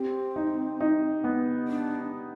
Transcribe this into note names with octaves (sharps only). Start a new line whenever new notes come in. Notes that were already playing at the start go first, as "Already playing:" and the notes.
Already playing: C4 G4
D#4
D#4
B3
D4